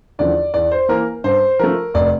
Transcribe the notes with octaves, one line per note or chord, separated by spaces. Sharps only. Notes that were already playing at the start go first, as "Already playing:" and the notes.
E2 D3 F3 A3 D5
E2 D5
C5
E3 A#3 A#4
G2 C5
F3 A3 A#4
F1 D5